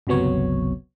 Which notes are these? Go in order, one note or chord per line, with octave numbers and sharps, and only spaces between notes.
G1 C#2 C3 F#3 B3 C#5